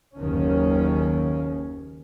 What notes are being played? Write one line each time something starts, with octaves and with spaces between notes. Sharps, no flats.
F#1 D#2 D#3 C#4